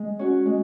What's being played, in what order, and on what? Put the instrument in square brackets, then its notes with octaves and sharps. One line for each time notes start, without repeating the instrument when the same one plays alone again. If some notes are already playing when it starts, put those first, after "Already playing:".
Already playing: [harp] G#3
C#4 F#4
G#3